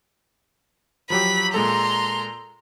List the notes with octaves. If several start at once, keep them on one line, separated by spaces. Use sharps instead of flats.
F3 F#3 G4 B5
A#2 G#3 A4 A#5 C6